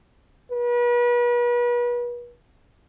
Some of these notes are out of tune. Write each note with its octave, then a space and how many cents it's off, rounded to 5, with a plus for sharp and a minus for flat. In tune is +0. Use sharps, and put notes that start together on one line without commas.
B4 -35